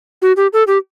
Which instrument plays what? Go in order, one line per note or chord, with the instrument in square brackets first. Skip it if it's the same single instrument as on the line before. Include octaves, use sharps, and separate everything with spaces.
[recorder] F#4
G4
A4
G4